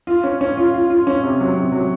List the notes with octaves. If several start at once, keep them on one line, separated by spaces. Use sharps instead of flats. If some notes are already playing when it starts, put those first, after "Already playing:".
F4
C#4
C#4
F4
F4
F4
C#4
C3
F#3
C3
F#3